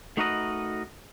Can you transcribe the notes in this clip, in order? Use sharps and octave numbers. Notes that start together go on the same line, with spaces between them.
A3 D#4 F#4 A#4 B4 D#5